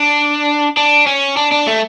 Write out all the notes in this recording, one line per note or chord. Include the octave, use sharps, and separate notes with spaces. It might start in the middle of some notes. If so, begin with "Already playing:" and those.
Already playing: D4
D4
C#4
D4
D4
A3